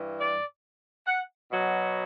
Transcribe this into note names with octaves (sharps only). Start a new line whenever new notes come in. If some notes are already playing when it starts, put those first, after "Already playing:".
Already playing: G2 E3
D5
F#5
B2 F#3